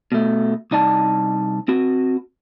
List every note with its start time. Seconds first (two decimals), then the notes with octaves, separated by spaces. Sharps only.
0.12 B2 A3
0.71 C2 D#4 D5 A5
1.68 C4 F#4